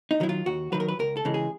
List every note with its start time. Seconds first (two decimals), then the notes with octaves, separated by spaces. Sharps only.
0.11 D#4
0.20 D#3 F#3 E4
0.29 F4
0.46 D#2 F#4
0.72 D#3 F#3 B4
0.80 A#4
0.88 B4
0.99 C#2 A#4
1.17 A4
1.25 C#3 E3 G#3
1.34 G#4